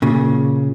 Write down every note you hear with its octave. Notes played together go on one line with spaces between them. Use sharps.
A#2 C#3